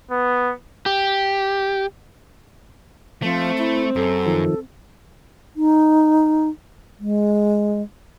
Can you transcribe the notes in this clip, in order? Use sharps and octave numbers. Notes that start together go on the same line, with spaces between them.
B3
G4
F3 A3 C4
E4
F#2 A4
D#3 F3
D#4
G#3